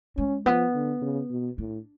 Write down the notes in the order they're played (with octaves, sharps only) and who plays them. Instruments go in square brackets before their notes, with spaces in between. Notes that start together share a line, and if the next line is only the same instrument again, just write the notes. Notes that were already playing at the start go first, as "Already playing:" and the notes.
[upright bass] G#3 [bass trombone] C#4
[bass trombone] F3 [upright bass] B3
[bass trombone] D3
C#3
B2
[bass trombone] A2 [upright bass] D4